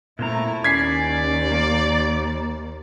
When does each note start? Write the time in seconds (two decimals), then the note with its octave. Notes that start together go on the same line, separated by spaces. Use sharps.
0.19 A#2 A3 C4 E4 A#5
0.64 D#2 C#4 D5 G#6 B6 C7
1.52 A#3